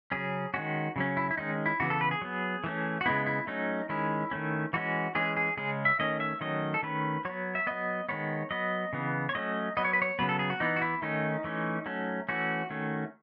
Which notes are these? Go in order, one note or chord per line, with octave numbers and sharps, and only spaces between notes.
C#3 F#3 C#4 G#4
D#3 G#3 C#4 F#4
C#3 F#3 C#4
E4
E4
D#3 G#3 C#4 D#4
E4
C#3 E3 B3 F#4
A4
B4
G#4
F#3 B3
E3 A3 C#4
F#4
C#3 G#3 B3 E4
E4
F#3 A3 C#4 D#4
D#3 G#3 C#4 E4
D#3 A3 C#4
E3 G#3 C#4 F#4
E3 G#3 C#4 G#4
G#4
C#3 G#3 C#4 G#4
E5
D#3 A3 C#4 D#5
E5
D#3 F#3 A3 C#4 D#5
A4
D#3 A3 C#4 B4
F#3 B3 C#5
E5
F#3 B3 D#5
D#3 G#3 B3 C#5
F#3 B3 D#5
C#3 E3 B3
C#5
F#3 A3 C#4 D#5
F#3 B3 D#5
C#5
B4
C#5
C#3 F#3 B3 B4
A4
G#4
F#4
E3 B3 D#4
F#4
E4
D#3 A3 C#4 D#4
E3 A3 C#4
F#3 A3 C#4
E3 A3 C#4 F#4
D#3 A3 C#4